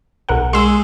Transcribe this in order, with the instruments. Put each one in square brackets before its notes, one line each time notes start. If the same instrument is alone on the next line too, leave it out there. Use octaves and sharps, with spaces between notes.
[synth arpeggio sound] B1 A#4 F#5
[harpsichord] G#3 G#4 [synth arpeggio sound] C6 E6